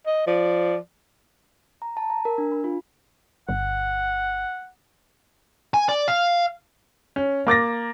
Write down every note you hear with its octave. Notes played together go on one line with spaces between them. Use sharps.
D#5
F3 D5
A#5
A5
A#5
A#4
D4
B5
F4
G1 F#5
G#5
D5
F5
C#4
A#3 D6 A6 A#6